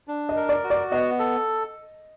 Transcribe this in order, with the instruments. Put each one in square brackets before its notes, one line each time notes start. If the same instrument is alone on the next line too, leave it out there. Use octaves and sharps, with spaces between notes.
[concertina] D4
[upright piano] D#5
[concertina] A#4
[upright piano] D5
[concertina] F#4
[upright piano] D5
[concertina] B3 [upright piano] D#5
[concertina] A4